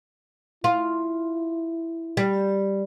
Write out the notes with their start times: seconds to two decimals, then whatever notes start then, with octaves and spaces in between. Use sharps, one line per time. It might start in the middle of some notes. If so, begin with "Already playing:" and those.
0.64 E4 F4
2.17 G3